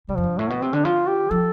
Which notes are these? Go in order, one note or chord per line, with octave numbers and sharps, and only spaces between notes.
C3 G3
F2 F3
G2
A2 A3
B2 B3
C3 C4
D3 D4
F3 F4
G4
F3 A4